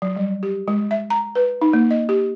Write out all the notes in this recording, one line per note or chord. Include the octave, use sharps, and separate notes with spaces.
F#3
G3
G4
G#3
E5
A#5
B4
D#4
A#3
D#5
G4